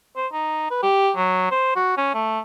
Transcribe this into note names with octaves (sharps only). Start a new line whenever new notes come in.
C5
D#4
B4
G4
F#3
C5
F#4
C#4
A3